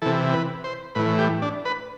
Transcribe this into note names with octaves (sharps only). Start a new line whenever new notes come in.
C3 E3 A4
B4
C5
A2 E3 B4
G4
D4
B4